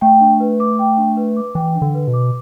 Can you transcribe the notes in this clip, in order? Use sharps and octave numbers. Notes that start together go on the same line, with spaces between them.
A3 G5
D4
B4
D6
G5
D4
B4
D6
E3 G5
D4
D3
B4
B2
D6